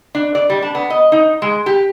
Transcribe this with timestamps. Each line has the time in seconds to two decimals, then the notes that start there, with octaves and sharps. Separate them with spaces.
0.15 D4
0.35 D5
0.50 G3
0.62 D4
0.75 B3
0.90 D#5
1.12 D#4
1.42 G#3
1.66 G4